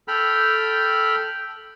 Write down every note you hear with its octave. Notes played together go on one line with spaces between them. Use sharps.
A4 G5 B5 F6